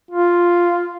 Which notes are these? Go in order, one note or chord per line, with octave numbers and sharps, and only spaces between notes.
F4